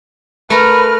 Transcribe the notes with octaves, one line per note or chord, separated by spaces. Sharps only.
A3 A#4 B4 F6